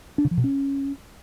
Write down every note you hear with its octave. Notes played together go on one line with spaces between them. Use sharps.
D4
C#3
F3
B2
C#4